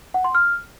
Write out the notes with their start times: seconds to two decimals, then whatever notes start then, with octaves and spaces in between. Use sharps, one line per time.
0.14 F#5
0.24 C6
0.35 F6